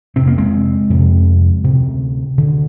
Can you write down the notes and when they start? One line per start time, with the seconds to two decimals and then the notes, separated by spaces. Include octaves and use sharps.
0.16 F2 C3 C4
0.27 A#3
0.38 G#3 C4
0.90 F2 C3
1.64 D2 C3
2.38 D2 D3